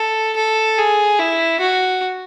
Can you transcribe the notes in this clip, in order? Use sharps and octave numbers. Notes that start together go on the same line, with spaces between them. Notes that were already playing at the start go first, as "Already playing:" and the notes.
Already playing: A4
A4
G#4
E4
F#4